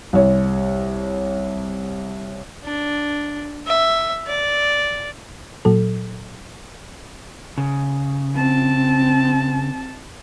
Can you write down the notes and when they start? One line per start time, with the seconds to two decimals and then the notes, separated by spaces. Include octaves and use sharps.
0.13 C2 C#5
2.65 D4
3.68 E5
4.27 D5
5.65 A#2 F#3 A4
7.58 C#3
8.34 C4 A5